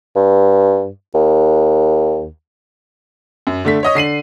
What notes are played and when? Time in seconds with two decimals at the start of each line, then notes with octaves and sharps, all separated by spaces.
0.16 G2
1.15 D#2
3.47 F#2
3.65 D3 A3 B6
3.83 C#5 D#5 D#6
3.95 D3 C7 D#7 F#7